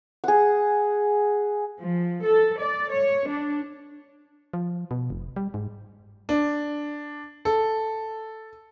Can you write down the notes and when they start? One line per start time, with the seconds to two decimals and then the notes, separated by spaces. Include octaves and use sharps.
0.24 G#4 F#5
1.80 F3
2.24 A4
2.59 D5
2.90 C#5
3.28 D4
4.53 F3
4.91 B2
5.10 F1
5.36 G3
5.54 G#2
6.29 D4
7.45 A4